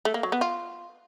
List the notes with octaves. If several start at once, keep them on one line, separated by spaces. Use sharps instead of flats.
A3
A#3
F#3
B3
F4